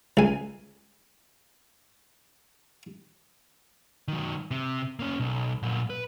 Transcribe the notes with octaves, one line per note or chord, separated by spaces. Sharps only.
C#2 G#5
D#3 F#3
C3
A#3 C#4
B1
A#2 F#3
B4